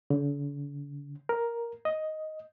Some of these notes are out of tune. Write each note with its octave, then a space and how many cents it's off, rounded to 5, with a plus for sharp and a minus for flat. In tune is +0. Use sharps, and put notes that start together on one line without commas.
D3 -45
A#4 +5
D#5 +5